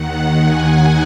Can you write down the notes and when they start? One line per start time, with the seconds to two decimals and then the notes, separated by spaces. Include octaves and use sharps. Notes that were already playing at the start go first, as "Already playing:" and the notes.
Already playing: D#2 D#3 F#5
0.38 G#5